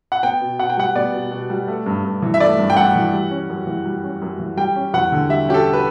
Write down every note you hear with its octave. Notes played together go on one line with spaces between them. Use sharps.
F#5
B3 G5
B2
B2 F#5
G5
G3 F#5
B3 D5
B2
B2
G3
A3
G2
G2
E3
E5
A3 D5
G2
G5
G2 F#5
E3
G3
C#4
F#2
E3
G3
C#4
F#2
E3
G3 G5
C#4
E2 F#5
D3
G3 E5
C#4 G4
A4
B4